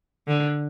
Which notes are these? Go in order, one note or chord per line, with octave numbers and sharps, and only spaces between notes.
D3